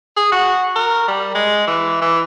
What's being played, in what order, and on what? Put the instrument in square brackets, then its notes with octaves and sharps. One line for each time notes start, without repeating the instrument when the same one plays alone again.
[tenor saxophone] G#4
F#4
A#4
G3
G#3
E3
E3